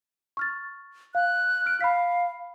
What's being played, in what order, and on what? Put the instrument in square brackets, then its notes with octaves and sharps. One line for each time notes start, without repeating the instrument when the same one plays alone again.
[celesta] C#6 F6 A6
[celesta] F5 [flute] F#6
[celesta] F6 D7
[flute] F5 [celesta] B5 F6 B6